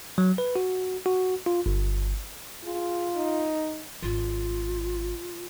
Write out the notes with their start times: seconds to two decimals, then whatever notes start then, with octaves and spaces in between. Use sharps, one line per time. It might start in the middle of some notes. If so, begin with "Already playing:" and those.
0.18 F#3
0.38 B4
0.56 F#4
1.06 F#4
1.46 F4
1.66 G1
2.64 F4 G#4
3.15 D#4
4.02 G#1 F4